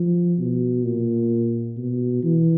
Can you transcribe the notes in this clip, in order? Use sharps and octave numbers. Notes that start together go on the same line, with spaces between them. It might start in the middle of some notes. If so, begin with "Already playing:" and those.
Already playing: F3
B2
A#2
B2
E3